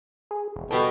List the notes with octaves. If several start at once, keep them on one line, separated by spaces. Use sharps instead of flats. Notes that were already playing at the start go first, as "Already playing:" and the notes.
G#4
E1
B2 G3 F#4 A4 G5